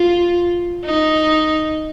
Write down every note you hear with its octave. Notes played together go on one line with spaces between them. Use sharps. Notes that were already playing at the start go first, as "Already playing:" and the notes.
Already playing: F4
D#4